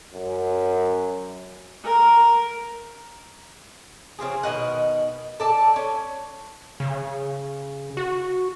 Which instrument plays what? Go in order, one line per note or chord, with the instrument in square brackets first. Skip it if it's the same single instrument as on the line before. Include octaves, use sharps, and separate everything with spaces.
[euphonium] F#2
[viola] A#4
[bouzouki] C#3 F3 C4 G#4
B2 D#3 D#5 F#5
A4 D5 A5
C#4
[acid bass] C#3
F#4